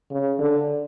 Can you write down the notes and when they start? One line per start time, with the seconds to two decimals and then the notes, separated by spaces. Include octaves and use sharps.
0.11 C#3
0.39 D3